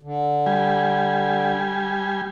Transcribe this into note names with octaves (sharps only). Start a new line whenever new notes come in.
D3
G3 G#5